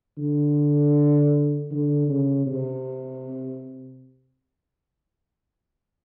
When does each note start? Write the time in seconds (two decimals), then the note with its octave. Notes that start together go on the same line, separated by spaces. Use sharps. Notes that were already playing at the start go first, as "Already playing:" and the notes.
0.18 D3
1.71 D3
2.08 C#3
2.47 C3